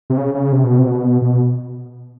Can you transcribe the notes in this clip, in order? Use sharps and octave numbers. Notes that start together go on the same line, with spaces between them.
C3
C#3
C#3
C3
B2
C3
B2
B2